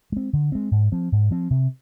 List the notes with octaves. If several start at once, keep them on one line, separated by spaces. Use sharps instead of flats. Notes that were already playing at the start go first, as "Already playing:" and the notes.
G#3 C4
D3
G#3 C4
G#2
F3 C4
G#2
F3 C4
C3